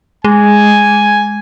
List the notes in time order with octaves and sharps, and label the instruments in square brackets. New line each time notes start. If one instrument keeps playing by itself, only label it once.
[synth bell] G#3 [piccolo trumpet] G#5